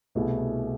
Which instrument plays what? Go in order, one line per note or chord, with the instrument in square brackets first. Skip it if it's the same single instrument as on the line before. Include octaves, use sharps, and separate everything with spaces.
[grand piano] C2 B2 A3 E4 G#4